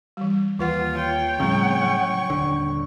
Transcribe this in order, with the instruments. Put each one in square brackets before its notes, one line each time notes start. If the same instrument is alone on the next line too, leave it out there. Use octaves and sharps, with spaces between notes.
[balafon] E3 G3
[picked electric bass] D#2 [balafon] E3 B4 F#5 [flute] F4
[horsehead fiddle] C#5 G5
[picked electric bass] A2 C#3 [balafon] F3 G3 C4 [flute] C#6
[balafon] F#3
[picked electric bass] D#1 D3